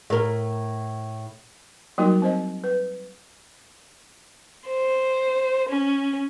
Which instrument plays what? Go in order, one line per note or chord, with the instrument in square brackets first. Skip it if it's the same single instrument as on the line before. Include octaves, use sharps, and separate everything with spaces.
[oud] A2 A#4
[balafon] F#3 G3 A#3 D#4 F#4 A#4
C4 C5 D#5
B4
[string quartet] C5
C#4